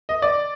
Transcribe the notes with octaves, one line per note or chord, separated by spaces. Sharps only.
D#5
D5